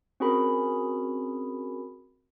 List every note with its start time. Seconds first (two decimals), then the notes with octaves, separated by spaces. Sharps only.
0.20 C4 C#4 F#4 G#4 A#4 B5